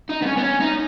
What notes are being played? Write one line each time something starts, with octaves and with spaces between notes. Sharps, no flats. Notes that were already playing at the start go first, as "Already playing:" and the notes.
D#4
B3
C#4
B3
C#4
D#4